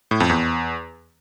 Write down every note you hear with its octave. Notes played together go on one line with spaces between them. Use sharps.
A2
F2
E2